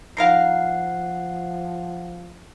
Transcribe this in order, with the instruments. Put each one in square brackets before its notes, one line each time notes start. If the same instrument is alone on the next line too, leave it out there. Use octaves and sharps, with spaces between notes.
[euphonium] F3 [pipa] D#4 A#4 F5 [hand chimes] F#5 C7